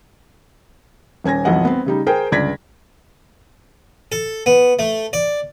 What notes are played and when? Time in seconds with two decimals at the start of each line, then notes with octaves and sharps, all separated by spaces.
1.24 D#1 C#4 G#5 G#6 A#6
1.45 D#1 B1 F2 E3 D#5 F#5
1.65 B3 C4
1.86 C#3 G3 D#4
2.07 G#4 A#4 C5 G5
2.31 G1 C#2 D5 G#6 A#6 B6
4.12 A4
4.46 B3
4.79 A3
5.13 D5